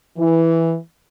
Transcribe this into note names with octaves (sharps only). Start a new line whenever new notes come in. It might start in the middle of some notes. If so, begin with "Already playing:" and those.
E3